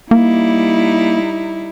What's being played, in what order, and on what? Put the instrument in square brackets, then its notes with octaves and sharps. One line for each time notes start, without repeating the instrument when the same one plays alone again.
[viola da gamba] G3 D#4 E4 [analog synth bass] A#3